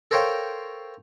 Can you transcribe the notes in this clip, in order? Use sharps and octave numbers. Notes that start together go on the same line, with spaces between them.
A4 A#4 C5 C#5 F5 G5